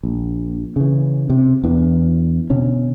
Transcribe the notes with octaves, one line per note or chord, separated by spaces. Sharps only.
A#1
C#3 E3
C3
E2 E3 D4
B2 D3 C#4